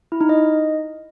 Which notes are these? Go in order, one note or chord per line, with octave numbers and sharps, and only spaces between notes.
E4
D#4
D#5